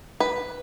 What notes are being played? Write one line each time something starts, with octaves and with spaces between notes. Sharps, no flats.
B4